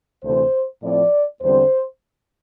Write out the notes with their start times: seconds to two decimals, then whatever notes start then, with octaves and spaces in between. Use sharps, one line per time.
0.23 D2 C3 E3 A3 C5
0.82 A2 F3 C4 D5
1.41 E2 D3 G3 C4 C5